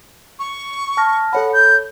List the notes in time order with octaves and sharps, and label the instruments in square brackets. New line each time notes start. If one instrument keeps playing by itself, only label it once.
[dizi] C#6
[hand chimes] A5 F6 A#6
[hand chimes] A4 C#5 B5 [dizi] F#5
[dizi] G6